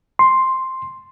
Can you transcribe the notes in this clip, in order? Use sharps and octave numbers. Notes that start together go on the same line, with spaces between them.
C6